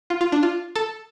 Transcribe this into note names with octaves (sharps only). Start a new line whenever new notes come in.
F4
F4
D4
F4
A4